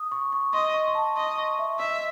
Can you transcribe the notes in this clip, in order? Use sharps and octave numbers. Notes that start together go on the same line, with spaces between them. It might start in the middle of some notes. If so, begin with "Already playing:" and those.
Already playing: D#6
C#6
C#6
D#5 C6
C#6
C6
A5
D#5 C6
C#6
E5
D#5 E5